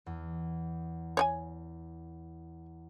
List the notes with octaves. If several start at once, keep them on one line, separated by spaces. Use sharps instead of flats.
E2
C#5 D5 G#5